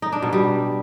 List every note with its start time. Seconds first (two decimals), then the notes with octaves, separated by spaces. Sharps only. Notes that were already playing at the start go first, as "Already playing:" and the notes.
0.02 D#4
0.12 D4
0.22 B2
0.33 G3